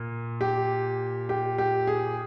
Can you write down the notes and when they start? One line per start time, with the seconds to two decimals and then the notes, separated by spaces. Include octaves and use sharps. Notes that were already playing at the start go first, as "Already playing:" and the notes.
Already playing: A#2
0.41 G4
1.29 G4
1.58 G4
1.87 G#4